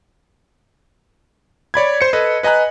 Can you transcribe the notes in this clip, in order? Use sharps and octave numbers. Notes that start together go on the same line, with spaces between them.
C#5 D5 B5 G#6
C5 C#7
A4 B4 D#5
B4 D#5 G#5 A#5 F#6